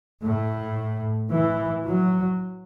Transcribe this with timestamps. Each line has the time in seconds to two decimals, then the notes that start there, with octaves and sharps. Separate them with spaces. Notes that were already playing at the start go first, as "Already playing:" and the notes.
0.25 A2
1.31 E3
1.85 F#3